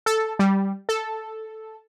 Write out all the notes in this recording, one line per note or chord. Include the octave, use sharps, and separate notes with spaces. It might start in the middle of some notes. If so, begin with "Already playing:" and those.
A4
G3
A4